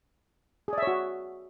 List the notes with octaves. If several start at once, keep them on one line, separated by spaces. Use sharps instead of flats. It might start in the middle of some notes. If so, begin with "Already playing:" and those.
F#4 G#4 C#5 D5 E5